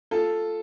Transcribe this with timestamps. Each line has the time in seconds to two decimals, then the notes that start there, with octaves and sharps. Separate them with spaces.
0.11 F4 A4